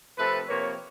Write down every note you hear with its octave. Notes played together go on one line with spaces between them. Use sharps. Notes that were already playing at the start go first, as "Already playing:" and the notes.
C3 F3 A3 C4 A4 B4
C3 F3 A#3 B4 C#5